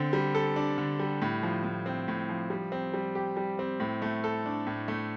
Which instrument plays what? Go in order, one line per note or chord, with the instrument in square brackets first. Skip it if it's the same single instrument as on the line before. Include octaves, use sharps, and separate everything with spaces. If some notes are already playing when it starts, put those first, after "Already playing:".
Already playing: [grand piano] D3 C4
G3
A4
D4
D3
G3
A2
F3
A2
C4
A2
F3
G3
C4
G3
G4
G3
C4
A2
A3
A4
D4
A2
A3